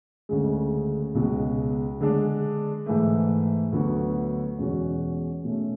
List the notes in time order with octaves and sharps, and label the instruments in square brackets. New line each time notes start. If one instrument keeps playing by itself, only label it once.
[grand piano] D2 C#3 G#3
C#2 B2 G#3
D3 G#3 D4
G#2 E3 A3
D2 D3 F#3 B3 F#4
E2 B2 G#3 C#4 F#4
B2 A3 C#4